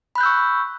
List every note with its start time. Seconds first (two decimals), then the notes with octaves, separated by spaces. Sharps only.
0.16 B5
0.18 F#6
0.21 G6
0.23 E6
0.26 C#6